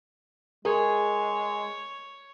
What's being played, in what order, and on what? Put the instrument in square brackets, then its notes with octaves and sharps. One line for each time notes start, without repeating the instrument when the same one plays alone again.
[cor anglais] G#3 [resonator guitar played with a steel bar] G#4 [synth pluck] A#4 [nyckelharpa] C#5